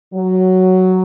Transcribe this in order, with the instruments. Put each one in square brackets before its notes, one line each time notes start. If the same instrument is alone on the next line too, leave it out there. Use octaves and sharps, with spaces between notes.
[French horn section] F#3